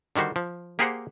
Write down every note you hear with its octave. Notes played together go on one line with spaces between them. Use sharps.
D3 D#3 G3 F#4 C5
F3
A#3 G4 G#4 A#4 C5 F#5